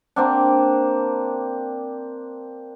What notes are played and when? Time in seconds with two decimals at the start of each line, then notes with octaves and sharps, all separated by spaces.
0.16 A#3 C4 D4